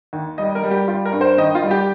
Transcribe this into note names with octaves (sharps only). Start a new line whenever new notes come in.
D#2
G3 D#5
A#4
G3
G4
G3 F4
A#4
G2
C5
D#3 D#5
F4
G3
G4